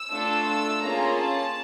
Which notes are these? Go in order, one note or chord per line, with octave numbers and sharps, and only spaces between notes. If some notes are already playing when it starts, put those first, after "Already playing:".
Already playing: E6
A3 D4 F4 A4
E6
A#3 C#4 F4 G#4 A#5
A5